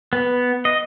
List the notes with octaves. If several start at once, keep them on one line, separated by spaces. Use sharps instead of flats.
B3
D#5